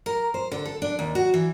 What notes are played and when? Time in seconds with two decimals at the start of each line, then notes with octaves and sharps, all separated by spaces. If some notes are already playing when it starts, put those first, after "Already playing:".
0.06 A#4
0.34 C5
0.52 D3
0.65 A4
0.82 D4
0.99 D#2
1.15 F#4
1.34 E3